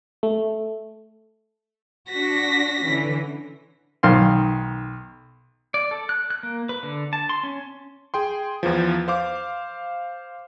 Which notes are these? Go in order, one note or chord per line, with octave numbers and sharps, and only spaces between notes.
A3
D4 F#4 A#6 B6
D3 E3 C#4
B1 D#3 F5 C6
D5
A4
F#6
F#6
A#3
B4
D3
A5
C6
C#4
G#4 G5 C6
E2 E3 F3
C5 F5 D6